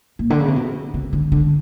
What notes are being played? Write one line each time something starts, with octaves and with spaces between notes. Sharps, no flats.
A#2
D3
C#3
C3
B2
C#3
D3
D3